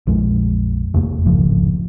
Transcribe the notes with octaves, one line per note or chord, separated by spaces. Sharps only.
A#1 F2 G#3
F1 F2 A3 A#3
D1 G#1 C#2 F3